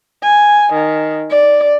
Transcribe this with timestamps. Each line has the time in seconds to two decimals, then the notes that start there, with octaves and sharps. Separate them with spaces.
0.23 G#5
0.73 D#3
1.30 D5